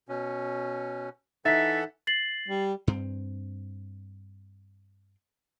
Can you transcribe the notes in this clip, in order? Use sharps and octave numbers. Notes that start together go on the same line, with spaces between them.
B2 C#4
E3 D#4 A4 E5 F#5 A6 B6
A6 C7 F#7
G3
G2 C4